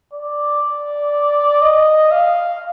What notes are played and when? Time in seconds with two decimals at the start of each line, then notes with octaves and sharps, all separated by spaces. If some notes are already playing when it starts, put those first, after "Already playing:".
0.13 D5
1.62 D#5
2.11 F5